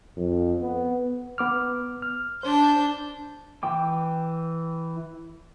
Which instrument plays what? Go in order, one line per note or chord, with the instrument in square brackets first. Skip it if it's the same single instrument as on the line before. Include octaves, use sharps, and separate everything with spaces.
[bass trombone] F2
B3
[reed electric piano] B3 D6 F6
F6
[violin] D4 G6 [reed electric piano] C5
[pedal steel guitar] E3 G5 D6